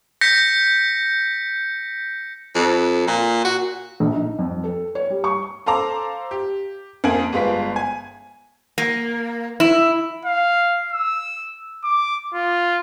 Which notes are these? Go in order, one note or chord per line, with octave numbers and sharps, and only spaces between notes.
G6 A#6 B6 C#7
F2
A#2
F#4
A#1
D#4
F2
A4
C#5
G3
C#6
A4 C5 F5 A5 A#5 D6
G4
F2 A#3 F5 G#5 D7 F#7
G1 G#3 F4 B4 B6
G#5
A#3
E4
F5
E6
D6
F4